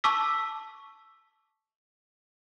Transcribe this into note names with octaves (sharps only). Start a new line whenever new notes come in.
A5 C#6 D6 E6 B6